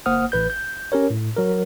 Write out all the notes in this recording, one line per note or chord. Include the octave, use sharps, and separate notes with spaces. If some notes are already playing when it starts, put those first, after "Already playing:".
G1 A#3 C5 F#5 D#6 F6
A1 B4 G6
G6
C#4 G4 A#4 C#5
A2
F#3 A#4